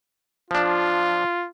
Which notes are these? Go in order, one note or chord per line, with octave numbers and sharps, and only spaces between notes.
F3 D4 F4